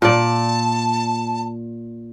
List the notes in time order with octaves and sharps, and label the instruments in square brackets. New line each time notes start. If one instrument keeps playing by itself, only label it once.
[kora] A#2 D5 [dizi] A5